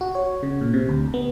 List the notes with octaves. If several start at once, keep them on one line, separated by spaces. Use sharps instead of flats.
F#4
C#5
C#3
A#2
C3
D2
B3